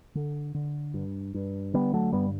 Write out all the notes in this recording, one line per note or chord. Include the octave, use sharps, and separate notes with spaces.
D3
D3
G2
G2
D3 G3 B3
F#3 A3
G2 G3 B3